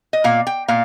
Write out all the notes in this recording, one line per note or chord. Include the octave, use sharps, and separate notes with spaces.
D#5
A#2 A#3 F5
G5
A#2 A#3 F5